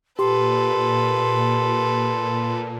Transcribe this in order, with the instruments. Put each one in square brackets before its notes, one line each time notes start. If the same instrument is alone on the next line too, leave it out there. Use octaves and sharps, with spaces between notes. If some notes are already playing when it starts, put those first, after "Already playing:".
[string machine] A#2 [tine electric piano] G4 [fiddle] A4 B4 [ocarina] C6